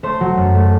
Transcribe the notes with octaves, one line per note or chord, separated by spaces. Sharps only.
A3 C5
F#3
F#2
A3